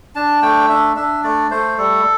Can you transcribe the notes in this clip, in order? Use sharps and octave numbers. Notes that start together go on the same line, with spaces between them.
D4 A5
A3 G5
D4 E5
D4 E5
A3 D5
A3 C5
G3 A4